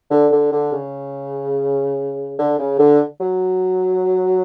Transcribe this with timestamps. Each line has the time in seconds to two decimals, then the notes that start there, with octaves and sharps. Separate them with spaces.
0.11 D3
0.31 D3
0.52 D3
0.72 C#3
2.38 D3
2.58 C#3
2.79 D3
3.20 F#3